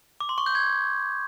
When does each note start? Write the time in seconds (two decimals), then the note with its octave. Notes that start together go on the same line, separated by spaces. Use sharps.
0.20 D6
0.29 C6
0.38 C#6
0.46 G6
0.55 G#6